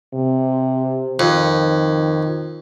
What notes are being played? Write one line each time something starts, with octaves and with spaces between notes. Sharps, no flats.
C3
F2 D#3